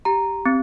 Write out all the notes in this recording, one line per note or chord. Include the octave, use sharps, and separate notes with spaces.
G4 A#5
C4